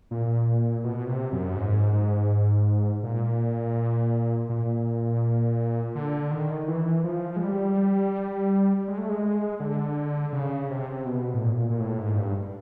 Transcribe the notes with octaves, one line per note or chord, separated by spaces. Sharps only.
A#2
B2
C3
F#2
G#2
G#2
A#2
A#2
D3
D#3
E3
F3
G#3
G3
G#3
A3
G#3
D3
C#3
C3
B2
A2
A#2
A#2
A2
G#2
G2